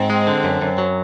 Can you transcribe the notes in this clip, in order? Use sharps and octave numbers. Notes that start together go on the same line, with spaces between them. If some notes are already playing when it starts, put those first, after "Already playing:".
Already playing: G#2 C4
G#3
D3
F#2
F#2
F#3